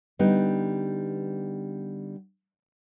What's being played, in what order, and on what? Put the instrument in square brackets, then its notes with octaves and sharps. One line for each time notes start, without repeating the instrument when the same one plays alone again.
[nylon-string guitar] D3 G3 B3 D#4